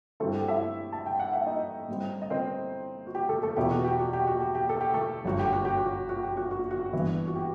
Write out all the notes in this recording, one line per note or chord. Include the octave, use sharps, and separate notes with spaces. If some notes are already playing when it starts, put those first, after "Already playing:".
G2 F#3 A3 C4 E4 A4
G4
E4 E5
A5
G5
F#5
E5
D#4 D#5
A2 G3 C4
D#5
C4 C5
F#4
G4
A3 A4
A3 A4
E2 B2 F#3 B3 E4 G4
F#4
G4
F#4
G4
F#4
G4
G4
A4
G4
A3 A4
G1 F#2 F#3 F#4
G4
F#4
G4
F#4
F#4
G4
F#4
F#4
F#4
G2 E3 B3 E4
F#4
G4